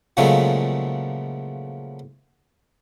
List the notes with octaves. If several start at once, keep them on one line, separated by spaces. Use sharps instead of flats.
A#2 C#3 F3 F#3 G#3 A3